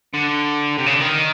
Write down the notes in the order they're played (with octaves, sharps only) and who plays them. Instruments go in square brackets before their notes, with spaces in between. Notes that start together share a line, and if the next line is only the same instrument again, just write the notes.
[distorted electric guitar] D3
C3
C#3
D3
D#3